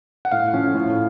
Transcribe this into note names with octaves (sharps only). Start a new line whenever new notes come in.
F#5
A2 F5
F3 A3 C#4
A2